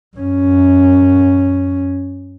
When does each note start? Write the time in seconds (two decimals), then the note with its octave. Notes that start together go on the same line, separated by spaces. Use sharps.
0.17 F#2 C#4